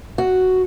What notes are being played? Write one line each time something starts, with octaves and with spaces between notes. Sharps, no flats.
F#4